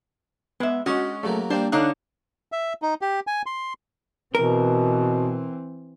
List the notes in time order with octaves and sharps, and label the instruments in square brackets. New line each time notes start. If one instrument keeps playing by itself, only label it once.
[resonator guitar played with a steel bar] G#3 E5 [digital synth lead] B3
[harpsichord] G#3 C6 D#6 [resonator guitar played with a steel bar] C#4 [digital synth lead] F#4
[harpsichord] C#3 F#3 A#3 [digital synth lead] A3
[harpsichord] G3 A#3 C4 [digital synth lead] D4 [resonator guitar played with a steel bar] C5
[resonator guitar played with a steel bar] D3 D#4 F5 [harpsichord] C#5 [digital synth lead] F#6
[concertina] E5
D#4
G4
G#5
C6
[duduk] B2 [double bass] E3 C4 [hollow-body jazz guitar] A#4